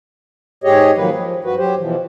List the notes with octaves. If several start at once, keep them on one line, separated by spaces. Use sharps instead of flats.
G#2 G#3 G4 G#4 C#5 D#5
D#3 F3 F#3 A#3 B4
F3
G2 F#4 B4
F#3 G4 C5
B2 E3 F3